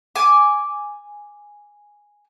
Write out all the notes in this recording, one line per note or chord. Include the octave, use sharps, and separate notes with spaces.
G#5 D6